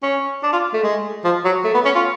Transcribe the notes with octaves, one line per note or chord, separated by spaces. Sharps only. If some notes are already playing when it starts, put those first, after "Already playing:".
C#4
D4
F4
A3
G#3
F3
F#3
A3
B3
C#4
F4